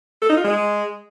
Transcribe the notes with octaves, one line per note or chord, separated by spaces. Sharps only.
A4
D#4
F4
G#3